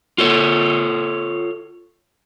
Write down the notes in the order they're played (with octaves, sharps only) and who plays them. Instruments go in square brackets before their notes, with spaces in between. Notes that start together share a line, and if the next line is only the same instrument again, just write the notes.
[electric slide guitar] F4 A4 C#5